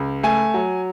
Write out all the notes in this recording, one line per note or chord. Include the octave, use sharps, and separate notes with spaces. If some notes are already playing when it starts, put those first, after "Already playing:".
Already playing: C#2
A3 G#5
F#3